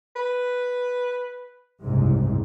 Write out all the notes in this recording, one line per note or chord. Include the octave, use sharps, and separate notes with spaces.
B4
F#1 C2 G#2